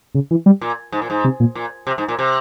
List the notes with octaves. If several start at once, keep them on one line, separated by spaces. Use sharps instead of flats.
C#3
E3
G3
A#2
G#2
A#2
G#2
C3
A#2
A#2
C3
G#2
A#2
C3